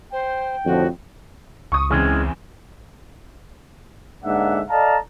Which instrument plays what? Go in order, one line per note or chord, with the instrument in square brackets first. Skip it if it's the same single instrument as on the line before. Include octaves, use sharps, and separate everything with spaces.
[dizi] C5 [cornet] G5
[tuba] F2 [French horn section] A2 D3 F3 [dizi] F#4
[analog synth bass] C#2 [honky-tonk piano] C#6 D#6
[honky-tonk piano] E2 C#3 C4 [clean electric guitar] G#3 C#4
[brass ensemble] G#2 D3 A#3 D4 E5 F#5
A4 D5 D#5 F5 A5 A#5